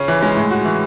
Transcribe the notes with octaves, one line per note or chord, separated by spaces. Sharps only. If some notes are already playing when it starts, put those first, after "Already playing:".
Already playing: C#3 C#4
E3
G#3
A2
F#4
E3